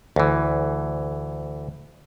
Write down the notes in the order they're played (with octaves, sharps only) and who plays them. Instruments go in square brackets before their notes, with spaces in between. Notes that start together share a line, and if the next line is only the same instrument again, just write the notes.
[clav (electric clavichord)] D2 E3